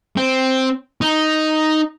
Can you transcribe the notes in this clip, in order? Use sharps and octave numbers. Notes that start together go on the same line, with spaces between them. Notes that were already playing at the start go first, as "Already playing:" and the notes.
C4
D#4